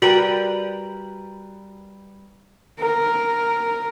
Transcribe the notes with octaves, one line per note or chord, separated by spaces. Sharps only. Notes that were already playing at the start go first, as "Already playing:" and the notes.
G3 F#4 A#4 B4 F#7
A#4